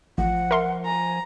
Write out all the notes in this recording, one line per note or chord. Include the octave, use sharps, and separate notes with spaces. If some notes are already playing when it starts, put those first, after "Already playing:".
A1 F3 F#5
A#4 E5 C6
G#5 A#5